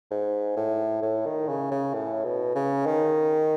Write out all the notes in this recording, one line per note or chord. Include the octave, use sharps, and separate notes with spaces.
G#2
A2
A2
D#3
C#3
C#3
A2
B2
C#3
D#3